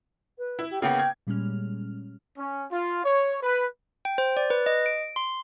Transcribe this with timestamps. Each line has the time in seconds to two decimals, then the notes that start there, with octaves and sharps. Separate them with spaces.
0.38 B4
0.59 E4
0.71 G4
0.82 C#3 A#3 B3 G5
0.99 G#6
1.27 A#2 G3 G#3 C#4 F6
2.38 C#4
2.71 F4
3.04 C#5
3.42 B4
4.05 G5
4.18 C5
4.37 D5
4.50 B4
4.66 D#5
4.86 D7
5.16 C6